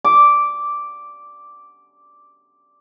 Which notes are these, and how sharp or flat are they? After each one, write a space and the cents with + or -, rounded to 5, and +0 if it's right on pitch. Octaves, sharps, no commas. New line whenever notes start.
D6 -5